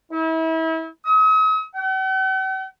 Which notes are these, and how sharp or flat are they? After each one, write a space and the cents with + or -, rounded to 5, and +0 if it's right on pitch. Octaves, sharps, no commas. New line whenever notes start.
E4 -35
D#6 +45
F#5 +45